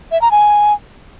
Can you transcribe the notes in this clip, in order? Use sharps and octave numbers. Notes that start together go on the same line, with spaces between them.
E5
A#5
G#5